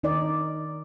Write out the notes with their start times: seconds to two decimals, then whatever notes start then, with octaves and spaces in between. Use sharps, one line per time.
0.03 D#3 D#4 A#4 D5 D#5